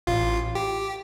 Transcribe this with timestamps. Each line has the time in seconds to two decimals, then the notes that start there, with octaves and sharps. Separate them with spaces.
0.07 A1 F4
0.55 G4